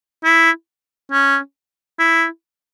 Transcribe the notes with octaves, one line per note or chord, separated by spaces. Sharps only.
E4
C#4
E4